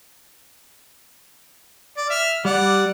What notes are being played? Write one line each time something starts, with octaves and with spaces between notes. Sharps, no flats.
D5
E5 F6
G3 D5 F#5